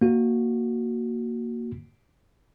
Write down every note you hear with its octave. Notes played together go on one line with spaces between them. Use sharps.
A#3 F#4